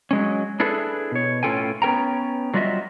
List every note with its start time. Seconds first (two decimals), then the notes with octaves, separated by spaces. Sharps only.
0.11 F#3 G#3 C#4
0.60 D4 E4 G#4 A4 B4
1.12 B2 C#5
1.43 A2 C#4 F4 A4 G5 G#5
1.82 B3 C#4 A#4 G5 A#5
2.54 F#3 G3 F4 F#4 D#5 E5